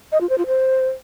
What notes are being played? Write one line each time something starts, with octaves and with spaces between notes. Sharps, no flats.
D#5
F4
C5
F4
C5